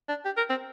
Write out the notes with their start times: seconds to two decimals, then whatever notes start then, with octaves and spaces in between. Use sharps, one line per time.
0.09 D4
0.25 G4
0.37 A#4
0.49 C4